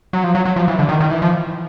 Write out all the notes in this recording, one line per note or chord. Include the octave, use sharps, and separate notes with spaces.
F#3
F3
F#3
F#3
F3
E3
D3
D#3
D#3
E3
F3